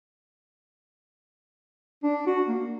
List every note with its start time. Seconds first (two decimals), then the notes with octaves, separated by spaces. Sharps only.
2.03 D4
2.27 F#4
2.48 A#3